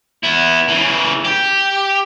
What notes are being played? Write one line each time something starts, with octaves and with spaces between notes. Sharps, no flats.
B3 E4
C#3 E3
G4